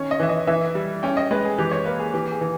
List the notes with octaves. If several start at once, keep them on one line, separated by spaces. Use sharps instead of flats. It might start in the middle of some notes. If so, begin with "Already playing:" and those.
Already playing: D#3 C#4 C#5
D#5
E3 E5
D#5
E3 E5
G3
C#4 G5
D#5
G#3 B4
G#4
E3 G4
C#5
A#3 B4
G#4
E3 G4
G#4
E3